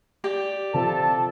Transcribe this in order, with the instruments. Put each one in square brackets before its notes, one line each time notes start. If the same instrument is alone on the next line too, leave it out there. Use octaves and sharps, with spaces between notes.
[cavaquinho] G4 D5 G5
[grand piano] C3 F3 [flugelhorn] A4 [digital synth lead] A5